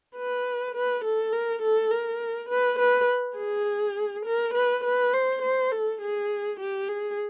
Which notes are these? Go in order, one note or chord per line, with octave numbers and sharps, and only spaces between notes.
B4
B4
A4
A#4
A4
A#4
B4
B4
G#4
A#4
B4
B4
C5
C5
A4
G#4
G4
G#4